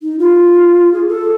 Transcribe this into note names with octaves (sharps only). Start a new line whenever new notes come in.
D#4
F4
G#4
A4